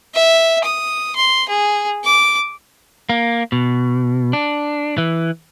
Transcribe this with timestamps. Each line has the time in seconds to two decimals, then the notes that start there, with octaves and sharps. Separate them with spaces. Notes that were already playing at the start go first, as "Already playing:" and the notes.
0.14 E5
0.65 D#6
1.16 C6
1.48 G#4
2.05 D6
3.09 A#3
3.52 B2
4.33 D4
4.98 E3